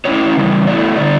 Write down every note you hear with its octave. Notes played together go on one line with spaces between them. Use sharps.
A2 F#3 C#4 E4 C#5
C#3 E3 G3
B2 A3 E4 D5
D3 G3 D4 D5